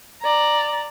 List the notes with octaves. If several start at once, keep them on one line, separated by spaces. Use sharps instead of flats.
D5 A#5